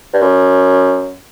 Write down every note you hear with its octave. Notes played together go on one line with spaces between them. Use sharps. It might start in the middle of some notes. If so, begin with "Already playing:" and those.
G2
F#2